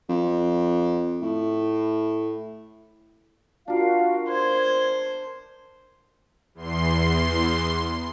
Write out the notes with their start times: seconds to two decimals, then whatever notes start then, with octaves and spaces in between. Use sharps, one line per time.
0.09 F2
1.22 A2
3.68 D4 F4 F#4 A#4 F5
4.29 C5 G#6
6.55 E2 C6